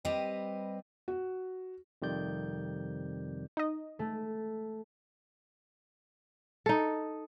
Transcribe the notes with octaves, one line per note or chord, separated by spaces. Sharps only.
G3 C4 G4 B4 D#5
F#4
F2 C3 D#3 G3 D5 G6
D#4 D#5
A3
D#4 A4